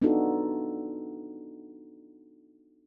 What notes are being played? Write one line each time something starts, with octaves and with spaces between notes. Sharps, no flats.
B3 D4 D#4 F4 F#4 A4